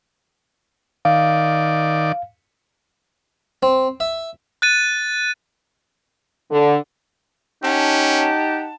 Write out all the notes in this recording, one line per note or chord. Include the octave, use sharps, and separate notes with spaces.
D#3 D5 F5
C4
E5
F#6 A6 D#7
D3
C#4 D#4 G4 F#5 A5